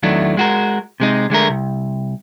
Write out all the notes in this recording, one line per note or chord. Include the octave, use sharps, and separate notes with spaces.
E2 D#3 E3 F#3 A3 D4
G#3 F#4 A#4
C3 G#3 D#4
D3 G#3 A3 A#4
C2